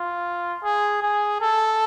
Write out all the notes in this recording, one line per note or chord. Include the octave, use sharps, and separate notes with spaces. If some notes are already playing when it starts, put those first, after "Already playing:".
Already playing: F4
G#4
G#4
A4